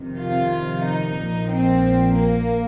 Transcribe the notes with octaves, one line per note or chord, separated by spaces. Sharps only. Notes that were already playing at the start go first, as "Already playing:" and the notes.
Already playing: F2 C3 D#3
F4
D#4
A#1 A#2 F3
C4
A#3